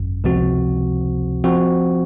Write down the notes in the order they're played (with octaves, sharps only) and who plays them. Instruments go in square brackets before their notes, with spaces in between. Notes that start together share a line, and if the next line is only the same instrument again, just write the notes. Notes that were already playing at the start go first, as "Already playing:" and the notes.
Already playing: [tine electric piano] G#1 F#2
C#2 C3 F3 C4 F#4
F3 C4 F#4